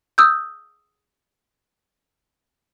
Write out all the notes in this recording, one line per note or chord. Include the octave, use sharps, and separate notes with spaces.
D#6 E6 G6